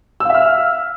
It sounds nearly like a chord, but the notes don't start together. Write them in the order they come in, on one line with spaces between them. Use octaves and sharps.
E6 F5 E5 F6